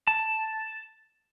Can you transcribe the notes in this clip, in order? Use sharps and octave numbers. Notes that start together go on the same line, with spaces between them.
A5